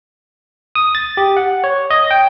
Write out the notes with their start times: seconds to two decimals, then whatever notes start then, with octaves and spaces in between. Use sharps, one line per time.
0.75 D#6
0.95 A6
1.17 G4
1.37 F#5
1.64 C#5
1.90 D#5
2.11 G5